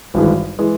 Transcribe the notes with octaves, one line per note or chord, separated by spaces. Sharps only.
G#1 G2 E3 G#3
E3 G#3